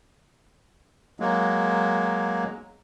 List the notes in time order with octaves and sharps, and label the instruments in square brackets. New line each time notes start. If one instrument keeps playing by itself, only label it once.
[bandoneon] F#3 G#3 A#3